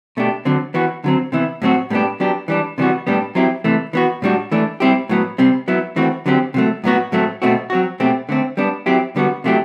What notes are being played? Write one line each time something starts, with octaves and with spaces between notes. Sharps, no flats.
B2 A3 D4 G4
D3 F#3 C4
E3 B3 F#4
D3 F#3 C4
C3 E3 B3 E4
A2 F#3 C4 F#4
A2 G3 B3 D4 G4
F#3 B3 D4 G4
E3 G3 D4
C3 E3 G3 B3 F#4
A2 G3 B3 D4 G4
F#3 C4 E4 G4
C3 E3 A3
E3 B3 F#4
A2 G3 D4 F#4
E3 A3 D4
G3 C4 E4 G4
A2 F#3 B3
C3 G3 C4
F#3 B3 E4
E3 A3 C4 F#4
D3 F#3 C4 G4
C3 F#3 A3
A2 F#3 B3 F#4
A2 F#3 A3 C4
B2 A3 C4 F#4
F#3 C4 F#4
B2 A3 C4 G4
D3 A3 C4
G3 B3 D4
F#3 C4 E4 G4
D3 G3 B3 F#4
C3 F#3 A3 E4 G4